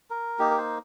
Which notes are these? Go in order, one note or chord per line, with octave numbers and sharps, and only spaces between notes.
A#4
A#3 D#4 G4
A#4
C5